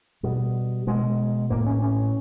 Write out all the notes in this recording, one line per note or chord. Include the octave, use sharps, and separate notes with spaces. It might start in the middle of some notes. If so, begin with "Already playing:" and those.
B2 G3
B2 G#3
A2 A#3
C#4
C#4